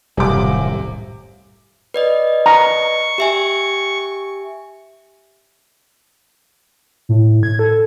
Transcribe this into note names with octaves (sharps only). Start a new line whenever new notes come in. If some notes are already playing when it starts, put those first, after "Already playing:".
D#1 C2 F#2 A2 C3 G3 G#5 D6
B4 D5 D#5
A#5 C#6
G4 E5 G#5
A2
G#6
A4